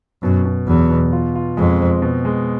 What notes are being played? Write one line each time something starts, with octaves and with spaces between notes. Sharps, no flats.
F#2 B2
B2
E2 F#3
B2
F4
F4
F2 G#3
C4
B2
G#3